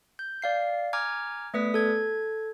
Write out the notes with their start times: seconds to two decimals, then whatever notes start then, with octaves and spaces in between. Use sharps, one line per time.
0.19 G6
0.42 D5 F5 C7
0.93 G#5 A#5 D6 F6 G#6
1.54 A3 B3 B4 D5 D#6 B6
1.74 A4 G#6